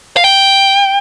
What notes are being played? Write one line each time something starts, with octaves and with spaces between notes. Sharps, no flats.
F5
G5